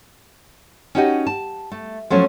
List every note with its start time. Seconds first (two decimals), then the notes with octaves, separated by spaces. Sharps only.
0.95 C#4 D#4 F#4 G4 D#5 F#5
1.27 A5
1.72 A3
2.10 F3 F#3 A3 C#4